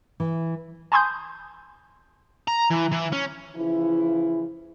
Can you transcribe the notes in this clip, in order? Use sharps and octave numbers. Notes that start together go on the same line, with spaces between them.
E3
G#5 A5 B5 C6 D#6 G6
A#5
E3
E3
C#4
C#3 E3 F3 E4